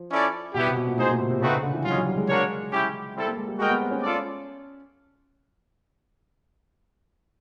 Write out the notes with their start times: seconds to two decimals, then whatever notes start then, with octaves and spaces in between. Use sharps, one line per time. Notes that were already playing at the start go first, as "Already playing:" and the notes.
Already playing: F3
0.11 C#4 E4 A4 D5
0.54 B2 G3 B3 E4 G4
0.67 C3
0.76 B2
0.87 A#2
0.97 A2 D#4 G#4 C5
1.09 A#2
1.20 C3
1.30 C3
1.41 C#3 A3 C4 D#4 F#4 B4
1.53 C#3
1.63 D3
1.74 E3
1.85 F#3 F4
1.88 G#3 C#4
1.96 F#3
2.06 G3
2.17 G#3
2.28 A#3 D4 F#4 A#4 C#5
2.71 C#4 E4 G4
3.15 G3 C4 E4 A4
3.26 A#3
3.37 G#3
3.48 G3
3.58 G#3 F#4 A#4 D#5 G5
3.69 B3
3.80 C4
3.91 C#4
4.03 F4 A4 D5